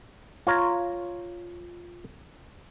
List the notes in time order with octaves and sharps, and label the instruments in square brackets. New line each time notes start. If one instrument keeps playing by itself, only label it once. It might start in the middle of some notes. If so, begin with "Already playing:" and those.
[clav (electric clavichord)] F4 C#5 A#5